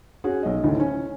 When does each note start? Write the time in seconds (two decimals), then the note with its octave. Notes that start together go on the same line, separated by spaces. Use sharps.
0.24 C#4 F#4 G#4
0.43 B1 D#5
0.64 D2 A2 D#3 E3
0.80 C#4